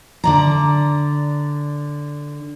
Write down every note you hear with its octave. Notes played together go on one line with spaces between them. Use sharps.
D3 D5 A#5